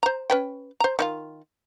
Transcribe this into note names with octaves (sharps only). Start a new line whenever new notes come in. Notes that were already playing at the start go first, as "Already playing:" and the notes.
C5 A#5
C#4 B4 G5
C5 A#5
D#3 E4 F4